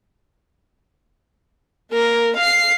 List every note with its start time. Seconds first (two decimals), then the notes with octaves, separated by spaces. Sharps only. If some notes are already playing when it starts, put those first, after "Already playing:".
1.92 A#3 A#4
2.36 F5 C7